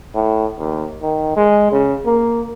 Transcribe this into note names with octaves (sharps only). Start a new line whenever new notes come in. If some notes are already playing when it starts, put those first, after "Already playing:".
A2
D#2
D#3
G#3
C#3
A#3